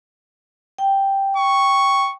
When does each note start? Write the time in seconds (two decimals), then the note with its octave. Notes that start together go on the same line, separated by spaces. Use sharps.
0.78 G5
1.37 C#6